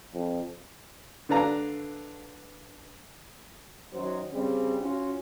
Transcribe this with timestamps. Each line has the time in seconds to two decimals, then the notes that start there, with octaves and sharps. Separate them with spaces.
0.14 F2
1.29 D3 D4 B4 D5 F5 A#5
3.93 F#2 D#3 F#3 C5
4.32 C#3 G3 C4
4.80 C#4 F4 F#4